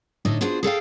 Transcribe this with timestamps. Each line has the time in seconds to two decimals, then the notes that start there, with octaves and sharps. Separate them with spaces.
0.25 A2 D3 D#4 D#5
0.41 B3 D4 F4 F#4 G#4 C5
0.63 G#4 A4 F5 G5